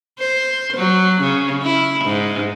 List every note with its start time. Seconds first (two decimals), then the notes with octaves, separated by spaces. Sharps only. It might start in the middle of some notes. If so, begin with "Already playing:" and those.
0.19 C5
0.77 F#3
1.21 C#3
1.63 E4
2.04 G#2